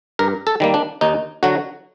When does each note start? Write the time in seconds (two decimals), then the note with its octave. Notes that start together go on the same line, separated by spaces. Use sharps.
0.19 G2 A#4
0.47 A4
0.60 D#3 G3 A#3
0.74 D4
1.01 D#2 D#4
1.43 D3 F#3 F#4